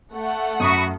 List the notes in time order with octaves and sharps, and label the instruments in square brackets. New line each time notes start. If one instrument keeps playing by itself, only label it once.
[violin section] A3 F#5
[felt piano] F#2 [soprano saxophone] F#4 [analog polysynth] B5 C#6 D#6